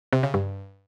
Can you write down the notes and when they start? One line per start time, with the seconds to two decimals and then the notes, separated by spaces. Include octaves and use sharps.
0.13 C3
0.23 C#3
0.34 G2